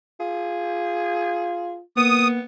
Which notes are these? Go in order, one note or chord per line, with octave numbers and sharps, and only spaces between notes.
F4 G#4
A#3 B3 D#6